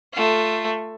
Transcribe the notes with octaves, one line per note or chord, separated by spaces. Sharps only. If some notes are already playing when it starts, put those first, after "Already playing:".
A3 F4